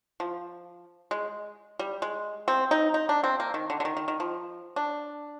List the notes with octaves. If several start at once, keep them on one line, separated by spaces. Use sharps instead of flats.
F3
G#3
G3
G#3
C4
D#4
D#4
D4
C4
A#3
D#3
D3
D3
D#3
D#3
D#3
F3
D4